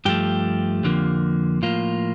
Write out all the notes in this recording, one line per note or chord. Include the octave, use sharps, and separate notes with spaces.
G2 F3 A3 G4
F2 D3 F3 A#3
A2 F3 A#3 F4